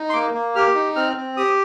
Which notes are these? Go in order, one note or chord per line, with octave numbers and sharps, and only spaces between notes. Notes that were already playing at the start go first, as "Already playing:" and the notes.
Already playing: D#4
C6
A#3 D6
A#3
G4 F6
D#4
C4 F6
C4
G4 D#6